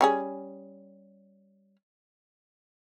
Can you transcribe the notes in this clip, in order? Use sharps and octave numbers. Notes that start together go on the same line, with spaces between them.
G3 C#4 G#4